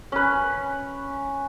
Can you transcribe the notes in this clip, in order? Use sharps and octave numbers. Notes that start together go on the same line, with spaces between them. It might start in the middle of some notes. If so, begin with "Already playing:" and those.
C#4 B4